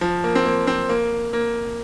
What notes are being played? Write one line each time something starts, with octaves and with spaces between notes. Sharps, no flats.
F3
A#3
C4
A#3
C4
A#3
A#3